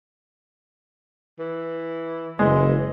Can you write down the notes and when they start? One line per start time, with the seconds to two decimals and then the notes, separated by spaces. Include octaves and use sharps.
1.39 E3
2.39 F#1 E3 G#3 D#5